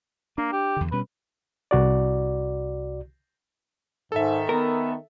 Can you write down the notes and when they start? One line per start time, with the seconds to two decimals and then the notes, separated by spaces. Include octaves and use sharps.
0.38 A#3 D4
0.52 G4
0.77 E2 D3
0.92 B2 G3 C#4 B4
1.71 C2 F#4 D5
4.12 G#2 D#3 A4 E5
4.49 B3 A#4